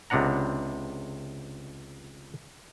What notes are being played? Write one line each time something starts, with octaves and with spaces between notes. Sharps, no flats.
C#2 C3 B3 D4 F#5 A#5